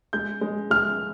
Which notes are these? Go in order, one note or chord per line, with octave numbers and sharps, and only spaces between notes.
G#3 G6
G#3
G#3 F6